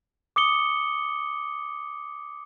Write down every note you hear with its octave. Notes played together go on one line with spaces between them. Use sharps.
D6 D#6 C#7 G7